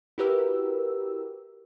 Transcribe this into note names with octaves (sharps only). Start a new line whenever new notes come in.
E4 F#4 G4 A#4 B4 E6